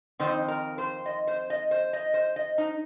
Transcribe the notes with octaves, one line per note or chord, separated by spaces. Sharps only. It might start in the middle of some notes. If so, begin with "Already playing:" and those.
F2 D#3 C4 D#4 C5
A#4
C5
D#5
C5
D#5
C5
D#5
C5
D#5
D#4